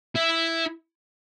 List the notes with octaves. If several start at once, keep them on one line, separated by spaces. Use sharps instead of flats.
E4